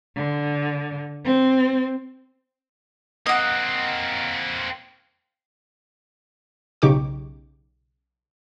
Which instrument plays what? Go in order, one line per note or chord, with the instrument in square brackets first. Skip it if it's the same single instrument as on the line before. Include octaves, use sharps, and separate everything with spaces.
[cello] D3
C4
[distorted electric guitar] A#3 C4 [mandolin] D#5 F#5
[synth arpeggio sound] B1 C#3 D#4 G4 C#6 D6